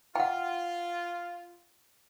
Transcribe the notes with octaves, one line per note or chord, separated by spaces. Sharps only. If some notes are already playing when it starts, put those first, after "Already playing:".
F4 F#5 G5